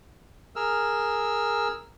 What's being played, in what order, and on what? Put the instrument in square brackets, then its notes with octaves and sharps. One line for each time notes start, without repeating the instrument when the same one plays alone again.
[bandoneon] G#4 A#4 E6 F6